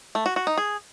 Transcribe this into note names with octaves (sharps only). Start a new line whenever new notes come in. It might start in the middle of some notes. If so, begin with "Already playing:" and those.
A3
F#4
F#4
D#4
G#4